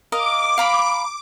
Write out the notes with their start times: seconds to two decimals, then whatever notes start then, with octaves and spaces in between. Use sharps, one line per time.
0.12 A#4 D#5 F5 D6
0.58 F5 A#5 B5